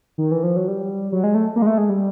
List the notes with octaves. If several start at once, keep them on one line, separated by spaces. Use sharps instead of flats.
D#3
E3
F3
F#3
G3
F#3
G#3
A3
A#3
G#3
A3
G#3
G3